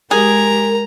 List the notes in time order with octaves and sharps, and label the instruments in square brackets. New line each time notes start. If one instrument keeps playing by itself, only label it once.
[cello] G#3 G4 [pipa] G#4 [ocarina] A#4 [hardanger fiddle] A#5